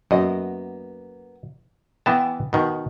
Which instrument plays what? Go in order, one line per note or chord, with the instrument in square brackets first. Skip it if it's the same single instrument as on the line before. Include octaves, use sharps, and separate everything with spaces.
[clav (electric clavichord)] F#2 [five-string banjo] A#3 B3 D#5
[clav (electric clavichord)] E3 B3 A5 [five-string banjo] G5
[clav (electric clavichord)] B2 D#3